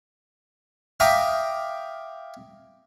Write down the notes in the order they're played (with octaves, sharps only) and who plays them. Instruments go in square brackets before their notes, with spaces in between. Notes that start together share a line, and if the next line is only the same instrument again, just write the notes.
[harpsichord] E5 F5 G5 A#5 D6 D#6